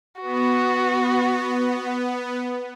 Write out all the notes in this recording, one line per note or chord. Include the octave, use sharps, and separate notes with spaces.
B3 F#4